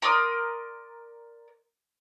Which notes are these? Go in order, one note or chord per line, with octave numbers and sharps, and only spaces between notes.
A#4 D5 C6 D#6